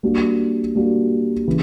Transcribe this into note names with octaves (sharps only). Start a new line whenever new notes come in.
G3 A#3 D4 F#4
G3 A#3 D4 F#4
C#3 E3